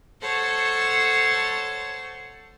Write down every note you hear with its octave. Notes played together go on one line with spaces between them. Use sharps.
A4 C5 C#5 F#5 A5